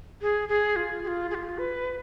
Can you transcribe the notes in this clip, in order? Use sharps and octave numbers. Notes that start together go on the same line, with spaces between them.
G#4
G#4
F4
G#4
F4
G#4
F4
B4